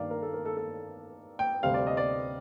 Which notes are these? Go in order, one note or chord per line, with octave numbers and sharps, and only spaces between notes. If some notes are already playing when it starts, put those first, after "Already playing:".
Already playing: G2 D#3 A#3 D5 F5
A#4
A4
A#4
A4
A4
G5
D2 C3 G3 C4 F5
D5
D#5
D5